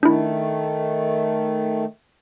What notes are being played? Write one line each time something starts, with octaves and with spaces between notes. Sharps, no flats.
D#3 A3 D4 E4